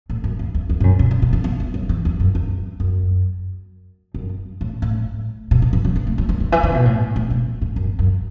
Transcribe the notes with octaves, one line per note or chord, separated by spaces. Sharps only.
A2
F#2
E2
E2
E2
A2
F#2
B2
D3
B2
E3
B3
E3
F#3
E3
E2
F#2
E2
F#2
F#2
A2
A2
B2
B2
E3
F#3
B3
A3
F#3
E3
D3
E3
D3
B2
A2
A2
B2
A2
F#2
F#2